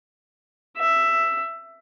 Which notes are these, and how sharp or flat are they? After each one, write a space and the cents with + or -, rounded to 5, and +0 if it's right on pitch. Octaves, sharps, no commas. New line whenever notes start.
E5 +10